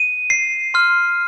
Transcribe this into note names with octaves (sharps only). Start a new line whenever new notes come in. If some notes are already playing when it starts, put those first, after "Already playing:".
Already playing: D#7
C7
C6 F6